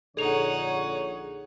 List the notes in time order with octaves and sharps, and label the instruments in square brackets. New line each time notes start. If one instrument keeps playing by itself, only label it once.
[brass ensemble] A#1 D3 C#5 [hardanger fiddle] D#4 F#5 [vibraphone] G#4 [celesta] A4 F7